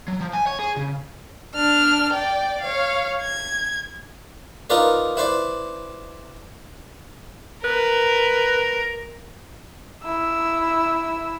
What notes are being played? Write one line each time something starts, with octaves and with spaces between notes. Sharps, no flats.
F#3
F3
G#5
C#5
G#4
C#3
D4 F6
D5 G5
C#5 F5
G#6
D#4 F4 A#4 B4 D5
E4 B4 C5 D5
A#4 B4
E4 E6